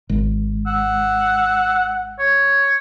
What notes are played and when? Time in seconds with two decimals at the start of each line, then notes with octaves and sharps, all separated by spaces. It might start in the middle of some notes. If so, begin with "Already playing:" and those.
0.09 G#1
0.67 F#5 E6
2.19 C#5